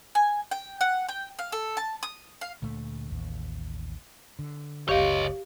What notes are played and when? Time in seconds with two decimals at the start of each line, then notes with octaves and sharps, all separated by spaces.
0.15 G#5
0.51 G5
0.81 F#5
1.09 G5
1.39 F5
1.52 A4
1.77 A5
2.03 D#6
2.41 F5
2.62 D2 A#2 A3
3.10 A1 D#2
4.39 D3
4.89 F#1 C#2 G4 C#5 D#5 F5